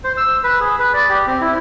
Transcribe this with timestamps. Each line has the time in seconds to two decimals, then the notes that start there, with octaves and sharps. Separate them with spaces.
0.04 C5
0.17 E6
0.44 B4
0.60 G#4
0.79 B4
0.94 D5
1.09 G4
1.27 C4
1.41 E4